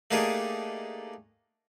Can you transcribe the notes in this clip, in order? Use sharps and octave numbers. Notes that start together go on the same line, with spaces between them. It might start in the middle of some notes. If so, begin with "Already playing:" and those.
A3 A#3 D4 D#4 G4 G#4